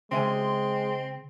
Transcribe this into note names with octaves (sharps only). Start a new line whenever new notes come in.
C#3 G#3 C4 E5 G#5 C6